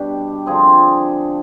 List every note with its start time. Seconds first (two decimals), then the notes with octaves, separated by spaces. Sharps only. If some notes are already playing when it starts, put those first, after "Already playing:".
Already playing: B2 G3 D4 G4
0.46 D3 F3 C4 G#4